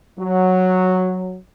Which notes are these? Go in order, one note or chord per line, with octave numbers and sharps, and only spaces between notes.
F#3